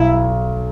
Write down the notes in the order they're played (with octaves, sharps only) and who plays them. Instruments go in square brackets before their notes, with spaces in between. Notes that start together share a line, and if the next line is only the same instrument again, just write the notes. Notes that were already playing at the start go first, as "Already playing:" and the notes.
Already playing: [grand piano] B1 [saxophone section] E4